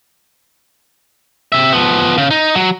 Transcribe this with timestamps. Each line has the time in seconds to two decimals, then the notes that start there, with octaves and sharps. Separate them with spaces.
1.52 C3 E5
1.72 F3 B3
2.18 C#3
2.31 D#4
2.55 F#3